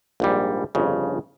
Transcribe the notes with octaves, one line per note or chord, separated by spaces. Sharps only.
A#1 G#2 G3
G1 F2 C#3